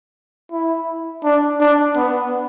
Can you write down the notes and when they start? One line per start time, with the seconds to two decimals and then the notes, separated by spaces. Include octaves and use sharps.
0.52 E4
1.24 D4
1.61 D4
1.96 B3